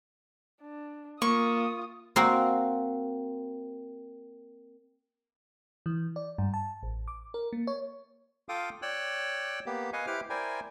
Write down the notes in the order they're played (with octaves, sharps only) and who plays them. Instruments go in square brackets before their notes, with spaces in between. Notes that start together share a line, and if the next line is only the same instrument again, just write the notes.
[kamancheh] D4
[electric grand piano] A#3 [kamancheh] F4 D#6 [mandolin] C#6
[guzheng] A#3 C4 F#4
[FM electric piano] E3
D5
G2
A5
A1
D6
A#4
A#3
C#5
[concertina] F4 A4 F5 G5 D6 D#6
C#5 D5 G5 E6 F#6
A#3 B3 G4
B4 D#5 F5 G#5 C#6
E4 G4 B4 C5 D6 F6
E4 A#4 C5 D5 G5 G#5